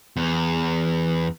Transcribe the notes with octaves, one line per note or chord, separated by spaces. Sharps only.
E2